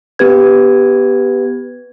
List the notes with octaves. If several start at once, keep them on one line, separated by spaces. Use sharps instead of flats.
B3 G4 B4 G#6